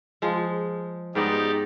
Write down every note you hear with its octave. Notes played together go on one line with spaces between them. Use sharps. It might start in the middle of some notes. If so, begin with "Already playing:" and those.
F3 G#3
G#2 B3 D#4 G4 D5